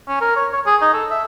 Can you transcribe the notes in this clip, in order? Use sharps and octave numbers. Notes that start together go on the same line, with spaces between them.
C#4
A#4
C#5
C#5
G#4
D#4
A4
E5